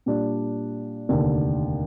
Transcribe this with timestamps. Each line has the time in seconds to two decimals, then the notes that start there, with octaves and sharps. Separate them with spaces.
0.06 A#2 G3 D4
1.09 F1 D#2 D3